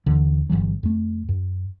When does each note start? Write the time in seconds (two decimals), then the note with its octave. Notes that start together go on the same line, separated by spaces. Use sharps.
0.06 D#2 D3 E3
0.50 G1 D2 E3 F#3
0.83 F2 A3
1.29 F#2